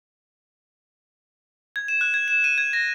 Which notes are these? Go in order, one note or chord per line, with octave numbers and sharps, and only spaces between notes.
G#6
E7
F#6
G#6
E7
D#7
G#6
A#6